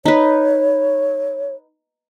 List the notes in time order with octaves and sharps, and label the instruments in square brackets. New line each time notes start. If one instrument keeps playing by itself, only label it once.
[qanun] D#4 B4 [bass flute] C#5